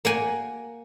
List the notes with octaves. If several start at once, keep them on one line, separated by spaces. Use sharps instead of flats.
A#3 F#5 G#5